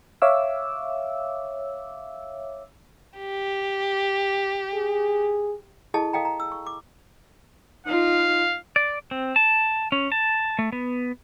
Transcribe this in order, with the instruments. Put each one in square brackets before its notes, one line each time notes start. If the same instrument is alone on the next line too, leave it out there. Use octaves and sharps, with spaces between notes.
[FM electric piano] C#5 E5 F5 D6 E6
[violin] G4
[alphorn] G#4
[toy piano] E4 G#4 A4 D#5 A5
A4 D#5 F5 G5 A#5
A#5
E6
C#6
D6
[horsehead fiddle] D#4 F4 [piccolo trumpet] F5
[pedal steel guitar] D5
C4
A5
C#4
A5
A3
B3